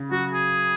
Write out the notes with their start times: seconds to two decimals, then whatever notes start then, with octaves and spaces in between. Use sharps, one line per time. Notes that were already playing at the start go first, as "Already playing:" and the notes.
Already playing: C#3
0.11 F#3 F#4
0.33 G#4